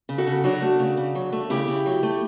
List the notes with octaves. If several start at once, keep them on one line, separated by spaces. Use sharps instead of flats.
C#3
F#4 A4
C#3
F#3 D4 F#4
A3
C#3
C#3
F#3
A3
C#3 E4 G4
C#3
F#3
A3